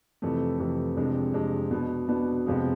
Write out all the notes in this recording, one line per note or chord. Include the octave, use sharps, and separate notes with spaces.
F2 C3 E3 A3
F2 C3 E3 A3
F2 C3 G#3 D4
F2 C3 G#3 D4
B2 B3 D4
B2 B3 D4
F2 C3 F3 G#3 B3